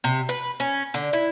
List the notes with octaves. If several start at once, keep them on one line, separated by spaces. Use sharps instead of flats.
C3
B4
C#4
D3
E4